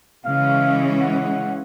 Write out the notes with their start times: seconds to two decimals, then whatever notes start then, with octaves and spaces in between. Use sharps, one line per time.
0.25 C#3 E3 G#3 C#4 F5
1.01 F#5